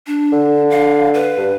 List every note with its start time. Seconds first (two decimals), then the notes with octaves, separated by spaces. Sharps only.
0.07 D4
0.33 D3
0.70 F5
1.14 B4
1.38 G2